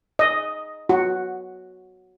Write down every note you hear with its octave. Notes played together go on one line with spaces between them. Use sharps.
D#5
F#4